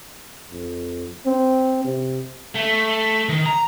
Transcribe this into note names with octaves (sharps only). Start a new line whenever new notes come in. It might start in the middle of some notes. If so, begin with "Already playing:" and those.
F2
C4
C3
A3
D#3
A#5